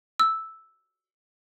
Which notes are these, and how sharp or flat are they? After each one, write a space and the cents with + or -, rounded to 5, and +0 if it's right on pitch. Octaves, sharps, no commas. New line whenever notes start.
E6 -5